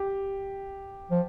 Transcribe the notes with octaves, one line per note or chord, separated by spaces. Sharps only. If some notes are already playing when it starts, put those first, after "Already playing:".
Already playing: G4
F3